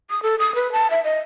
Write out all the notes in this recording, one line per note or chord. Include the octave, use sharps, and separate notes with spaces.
D#6
A4
D#6
B4
A5
E5
D#5